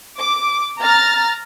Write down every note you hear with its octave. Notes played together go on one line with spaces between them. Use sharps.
D6
A#5 F6 A6